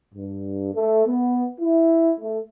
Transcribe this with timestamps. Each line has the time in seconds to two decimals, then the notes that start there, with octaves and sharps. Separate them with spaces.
0.14 G2
0.74 A3
1.07 B3
1.60 E4
2.19 A3